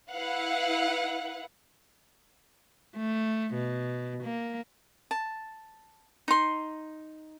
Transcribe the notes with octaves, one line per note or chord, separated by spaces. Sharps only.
E4 B4 F5 F#5
A3
B2
A#3
A5
D#4 C6